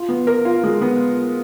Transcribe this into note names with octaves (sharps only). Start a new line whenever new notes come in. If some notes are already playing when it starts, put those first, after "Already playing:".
Already playing: F4
B3
A#4
F4
G#3
B3